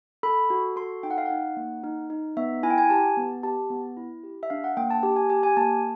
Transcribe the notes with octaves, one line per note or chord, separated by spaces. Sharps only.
A4 B5
F#4
A4 C6
D#4 G5
F#5
F5
D#4 F#5
A#3
D#4
D#4
B3 E5
E4 G#5
G5
G#5
G4 A5
B3
G4 A5
B3
E4
G4
E5
D4 F5
F#5
A#3 G5
A5
G4 A5
G#5
G4 G#5
G#5
A#3 A5